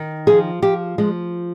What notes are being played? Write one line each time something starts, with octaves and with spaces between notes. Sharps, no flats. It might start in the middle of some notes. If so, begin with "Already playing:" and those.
Already playing: D#3
F3 G#4
F3 G4
F3 G#3